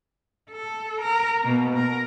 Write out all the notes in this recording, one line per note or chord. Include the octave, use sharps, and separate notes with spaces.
A4
A#4
B2 A#3
A#4